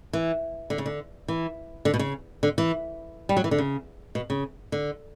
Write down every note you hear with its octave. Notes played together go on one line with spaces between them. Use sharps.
E3
D3
C#3
D3
E3
D3
B2
C#3
D3
E3
G3
F#3
E3
D3
C#3
B2
C#3
D3